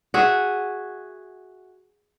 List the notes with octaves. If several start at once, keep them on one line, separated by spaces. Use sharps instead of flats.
F#4 G#4 E5